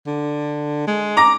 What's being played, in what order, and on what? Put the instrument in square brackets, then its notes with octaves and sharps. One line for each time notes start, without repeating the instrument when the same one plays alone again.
[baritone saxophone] D3
G#3
[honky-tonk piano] A#5 D6 A#6